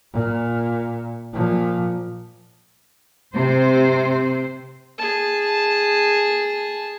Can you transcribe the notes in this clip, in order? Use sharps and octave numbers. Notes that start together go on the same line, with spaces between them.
A#2
A#2 F3
C3 C5
G#4 A5